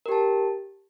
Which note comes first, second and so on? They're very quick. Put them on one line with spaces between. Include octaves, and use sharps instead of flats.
A#4 G4 A5